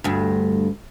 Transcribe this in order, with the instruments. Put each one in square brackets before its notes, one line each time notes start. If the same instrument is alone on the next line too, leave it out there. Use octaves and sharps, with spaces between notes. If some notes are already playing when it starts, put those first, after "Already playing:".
[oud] D2 G2